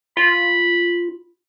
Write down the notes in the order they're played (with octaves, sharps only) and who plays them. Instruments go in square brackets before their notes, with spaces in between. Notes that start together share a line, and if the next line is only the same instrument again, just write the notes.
[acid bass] F4 [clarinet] B5